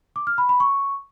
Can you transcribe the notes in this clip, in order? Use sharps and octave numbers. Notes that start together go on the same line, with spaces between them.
D6
F6
B5
B5
C#6